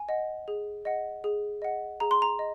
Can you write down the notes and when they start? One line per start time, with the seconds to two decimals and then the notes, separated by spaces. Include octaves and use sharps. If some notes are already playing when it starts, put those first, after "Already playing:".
Already playing: G#5
0.09 D#5 F#5
0.48 G#4
0.85 D#5 F#5
1.24 G#4
1.62 D#5 F#5
2.00 G#4 A#5
2.11 C6
2.22 A#5
2.39 D#5